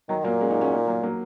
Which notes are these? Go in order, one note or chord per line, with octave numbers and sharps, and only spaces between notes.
D#3 F#3
A#2 F#3 A#3
G#3 C#4
A#3 D#4
C#4 F#4
A#3 D#4
F#3 A#3
F#3 A#3